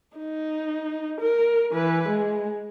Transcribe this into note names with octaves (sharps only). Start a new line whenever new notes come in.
D#4
A#4
E3 B4
G#3